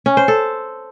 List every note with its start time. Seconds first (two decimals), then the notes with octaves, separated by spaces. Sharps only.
0.06 C#4
0.17 C5
0.28 A4